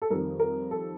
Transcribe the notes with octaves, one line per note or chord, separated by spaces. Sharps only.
A4
F2 D#3 G3 A#4
A#4
A4